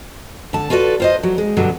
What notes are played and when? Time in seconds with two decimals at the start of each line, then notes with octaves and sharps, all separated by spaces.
0.53 D3 A5
0.70 F4 F#4 A4 B4 D5
1.00 F4 C5 D#5
1.23 F#3
1.38 G#3
1.57 G2 B2 D3 F#3 G3